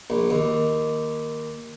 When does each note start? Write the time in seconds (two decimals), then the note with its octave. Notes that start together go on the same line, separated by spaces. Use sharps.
0.10 A#1
0.30 D#2